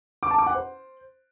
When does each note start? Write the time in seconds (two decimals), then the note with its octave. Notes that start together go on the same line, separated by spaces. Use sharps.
0.23 D6
0.31 A5
0.38 D6
0.46 F#5
0.54 C5